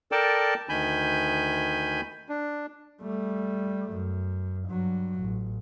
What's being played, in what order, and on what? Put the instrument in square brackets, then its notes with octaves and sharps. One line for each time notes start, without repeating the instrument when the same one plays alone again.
[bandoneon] A4 A#4 D5 G5 A5
D2 D#3 G#5 B5 G6
D4
[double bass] G3 A3
F#2
G2 F#3
A1